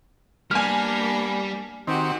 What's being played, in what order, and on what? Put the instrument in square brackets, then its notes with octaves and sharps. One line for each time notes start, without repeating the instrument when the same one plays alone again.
[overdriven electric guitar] G3 [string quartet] A#3 B3 D4 [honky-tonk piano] G#5 F6
[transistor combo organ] D#3 C4 [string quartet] F#4 G4